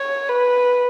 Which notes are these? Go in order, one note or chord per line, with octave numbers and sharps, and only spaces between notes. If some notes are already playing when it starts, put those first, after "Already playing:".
Already playing: C#5
B4